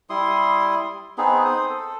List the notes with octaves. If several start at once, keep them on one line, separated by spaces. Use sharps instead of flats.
G3 E4 C6 D#6
B3 C4 D#4 G#4
C5 D#6
A4